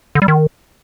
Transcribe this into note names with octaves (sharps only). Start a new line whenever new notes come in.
D3
G3
D#3